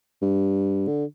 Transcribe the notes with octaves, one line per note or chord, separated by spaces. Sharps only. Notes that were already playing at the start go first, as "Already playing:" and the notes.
G2
D3